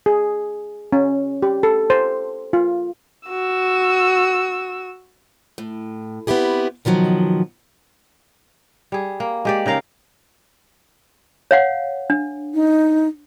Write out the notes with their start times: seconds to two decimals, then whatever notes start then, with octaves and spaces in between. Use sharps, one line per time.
0.06 G#4
0.93 C#4
1.43 G4
1.63 A4
1.90 C5
2.53 F4
3.29 F#4 E6
5.58 A2
6.27 B3 C4 E4 G4 G#4
6.85 B2 D#3 F3 F#3
8.92 G3 G#4
9.20 A#3
9.45 G#3 G4 D5
9.66 C#3 D#4 A#4 F5
11.51 C#5 F5 F#5
12.10 D4
12.54 D#4